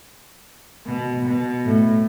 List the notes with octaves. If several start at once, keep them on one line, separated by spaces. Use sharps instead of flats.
B2
B2
A2